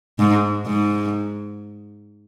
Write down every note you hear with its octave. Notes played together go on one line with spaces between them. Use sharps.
G#2
G#2